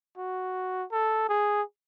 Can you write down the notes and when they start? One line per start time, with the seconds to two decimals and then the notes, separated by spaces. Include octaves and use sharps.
0.18 F#4
0.92 A4
1.29 G#4